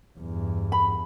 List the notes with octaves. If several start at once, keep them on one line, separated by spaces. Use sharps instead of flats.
E2 G2
B5